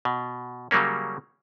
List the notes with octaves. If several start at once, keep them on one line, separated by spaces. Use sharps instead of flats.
B2
C#3 F#3 G3 A#3 C#4